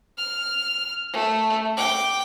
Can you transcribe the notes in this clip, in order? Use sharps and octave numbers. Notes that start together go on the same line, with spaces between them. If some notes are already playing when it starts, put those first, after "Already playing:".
F6
A3
G5 D6